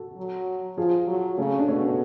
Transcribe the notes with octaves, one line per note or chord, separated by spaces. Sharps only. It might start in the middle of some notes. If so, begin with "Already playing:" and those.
Already playing: F#4 A4
F#3
F3 F4 G#4
F#3
C#3 A3 C#4
D4
B2 A3 C#4